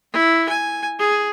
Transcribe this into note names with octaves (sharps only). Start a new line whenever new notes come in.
E4
G#5
G#4